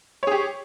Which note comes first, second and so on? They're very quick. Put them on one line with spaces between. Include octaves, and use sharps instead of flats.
C#5 G#4 G4